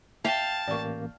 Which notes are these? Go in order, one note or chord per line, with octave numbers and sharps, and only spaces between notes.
E5 F5 G5 A5
A1 A#3 D5 C#6